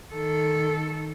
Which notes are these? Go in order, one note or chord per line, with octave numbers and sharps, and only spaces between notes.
D#3 A4